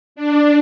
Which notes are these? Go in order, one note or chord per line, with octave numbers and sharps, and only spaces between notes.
D4